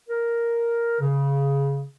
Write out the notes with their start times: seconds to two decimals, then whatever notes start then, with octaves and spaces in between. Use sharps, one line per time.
0.09 A#4
1.01 C#3